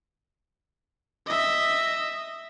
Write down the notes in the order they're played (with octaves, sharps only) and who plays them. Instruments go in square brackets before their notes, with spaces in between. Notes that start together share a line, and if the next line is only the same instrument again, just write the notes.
[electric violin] D#5 E5